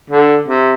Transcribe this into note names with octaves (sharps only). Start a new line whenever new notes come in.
D3
C3